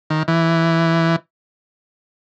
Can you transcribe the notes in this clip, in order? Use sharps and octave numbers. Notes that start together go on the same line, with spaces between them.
D#3
E3